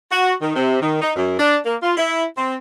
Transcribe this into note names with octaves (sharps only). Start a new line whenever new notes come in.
F#4
D#3
C3
D#3
D#4
F#2
D4
A#3
F4
E4
C4